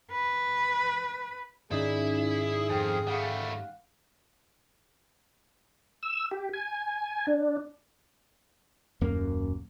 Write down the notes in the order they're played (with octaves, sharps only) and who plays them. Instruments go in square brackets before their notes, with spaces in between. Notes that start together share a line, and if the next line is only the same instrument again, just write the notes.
[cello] B4
[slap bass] G#2 D#3 [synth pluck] C#4 D#4 D5 [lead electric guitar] E4 [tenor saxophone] G#4
[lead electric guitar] F2 [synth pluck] G5 F6
[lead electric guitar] G3 A3 [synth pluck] F5 F#5
[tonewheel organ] E6
G4
G#5
D4
[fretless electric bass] D#1 F#2 A#3